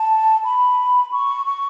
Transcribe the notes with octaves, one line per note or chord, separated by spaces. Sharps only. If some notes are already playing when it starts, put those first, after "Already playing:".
Already playing: A5
B5
C#6
C#6